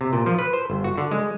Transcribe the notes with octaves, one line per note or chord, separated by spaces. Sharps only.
C3
A#2
F3
B4
C5
G1
F#4
D3
G#3